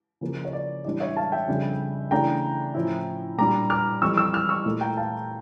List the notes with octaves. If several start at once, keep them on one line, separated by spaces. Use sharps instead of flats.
C#3 F3 A#3
C#5
D5
A2 E3 G3 D4 D5
C#5 E5
F5 A5
E5 G5
F2 C#3 G3 D4
C#3 E3 A3 D4 G5 A#5
A2 F3 C#4 E4
A#2 G3 D4 A#5 D6
D6 F6
F2 E3 G3 C#6 E6
C#6 E6
D6 F6
C#6 E6
A#2 A3 E4
G5 A#5
F5 A5